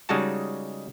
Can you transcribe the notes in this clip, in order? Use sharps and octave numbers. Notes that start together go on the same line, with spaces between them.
C#3 G3 G#3 D#4 F#4 A5